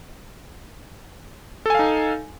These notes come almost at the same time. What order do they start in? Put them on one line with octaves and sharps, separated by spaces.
A4 G#5 F5 D#4